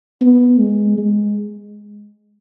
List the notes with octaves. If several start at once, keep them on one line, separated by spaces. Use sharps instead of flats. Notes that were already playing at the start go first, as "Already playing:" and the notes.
B3
G#3
G#3